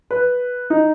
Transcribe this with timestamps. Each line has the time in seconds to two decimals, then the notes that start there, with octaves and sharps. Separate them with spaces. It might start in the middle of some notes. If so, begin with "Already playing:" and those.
0.11 B4
0.70 D#4